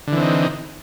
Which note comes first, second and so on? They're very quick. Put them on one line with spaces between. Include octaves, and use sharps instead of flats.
D3 E3 C4 D#4